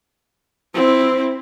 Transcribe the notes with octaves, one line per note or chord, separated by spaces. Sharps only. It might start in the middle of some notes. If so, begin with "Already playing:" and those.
C4 E4